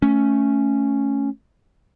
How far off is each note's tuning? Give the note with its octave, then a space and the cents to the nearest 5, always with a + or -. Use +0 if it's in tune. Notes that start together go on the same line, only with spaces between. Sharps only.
A3 +0 C#4 +0